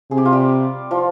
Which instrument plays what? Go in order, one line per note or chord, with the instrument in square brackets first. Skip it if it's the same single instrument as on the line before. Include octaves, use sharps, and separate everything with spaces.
[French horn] C3 [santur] G#4
[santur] G4
F4
G3 G4
F3 F4